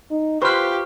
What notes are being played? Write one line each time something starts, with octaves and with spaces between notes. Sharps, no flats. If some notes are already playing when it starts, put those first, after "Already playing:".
D#4
F4 G4 B4 C5 C#6 F6